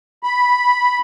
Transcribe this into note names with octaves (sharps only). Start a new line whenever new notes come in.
B5